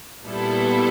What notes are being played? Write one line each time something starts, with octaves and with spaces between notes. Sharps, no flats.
A#2 G3 B3 E4 A4